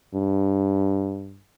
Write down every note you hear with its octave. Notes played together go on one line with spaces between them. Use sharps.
G2